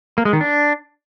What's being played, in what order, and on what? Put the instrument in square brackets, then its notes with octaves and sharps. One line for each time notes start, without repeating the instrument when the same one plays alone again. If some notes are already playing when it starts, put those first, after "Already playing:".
[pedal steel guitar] A#3
G#3
D#3
D4